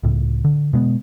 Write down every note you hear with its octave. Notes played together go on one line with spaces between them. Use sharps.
C#2 A2
D3
B2 G#3 B3